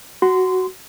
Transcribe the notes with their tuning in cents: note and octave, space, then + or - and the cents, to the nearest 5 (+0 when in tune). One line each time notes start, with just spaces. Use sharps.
F#4 +5 C6 -20